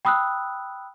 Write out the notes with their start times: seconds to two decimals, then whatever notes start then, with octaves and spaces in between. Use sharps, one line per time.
0.05 G5 B5 D#6 E6 F#6